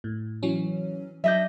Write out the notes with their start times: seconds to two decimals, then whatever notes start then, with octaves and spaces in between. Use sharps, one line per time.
0.04 A2
0.43 E3 F#3 C#4
1.24 F#3 D4 D#5 E5 G6